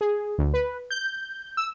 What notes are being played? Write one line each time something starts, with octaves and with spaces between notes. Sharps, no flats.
G#4
D2
B4
G6
E6